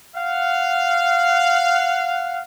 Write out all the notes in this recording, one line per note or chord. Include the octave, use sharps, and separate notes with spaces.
F5 F#5